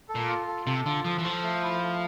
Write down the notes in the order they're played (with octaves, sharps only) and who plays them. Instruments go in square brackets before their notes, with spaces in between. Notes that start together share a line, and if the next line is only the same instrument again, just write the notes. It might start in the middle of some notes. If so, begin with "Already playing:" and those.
[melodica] A4
[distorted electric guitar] A#2
[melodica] F4
A4
[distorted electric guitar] C3 [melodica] A4
[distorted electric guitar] D3 [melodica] F4
[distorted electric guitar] F3 [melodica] A4
[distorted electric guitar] E3
[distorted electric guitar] F3 [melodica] A4
[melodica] A3
E4
A3